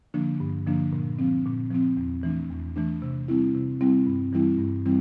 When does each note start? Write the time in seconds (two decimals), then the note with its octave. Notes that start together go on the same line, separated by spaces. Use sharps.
0.14 D3 F3 A#3 D4
0.40 G2
0.66 D3 F3 A#3 D4
0.93 A#2
1.19 F3 C4
1.46 A#2
1.71 F3 C4
1.97 E2
2.23 E3 A3 D4
2.50 E2
2.76 E3 A3 D4
3.02 C3
3.28 G3 C4 E4
3.55 C3
3.81 G3 C4 E4
4.07 G2
4.33 E3 G3 C4 E4
4.59 G2
4.86 E3 G3 C4 E4